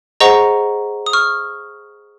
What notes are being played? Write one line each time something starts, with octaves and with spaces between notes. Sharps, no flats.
G#4 C5 D#5 F#5 A#5 C#6
D#6
C#6 F6